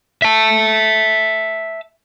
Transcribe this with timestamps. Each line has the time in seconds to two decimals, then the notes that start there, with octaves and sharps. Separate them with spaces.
0.22 E5 A5